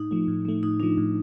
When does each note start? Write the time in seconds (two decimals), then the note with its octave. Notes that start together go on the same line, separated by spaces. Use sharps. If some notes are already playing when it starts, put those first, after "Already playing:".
Already playing: A2 D#4
0.11 F3 A3
0.28 A2
0.45 F3 A3
0.63 A2 D#4
0.80 F3 A3 D4
0.98 A2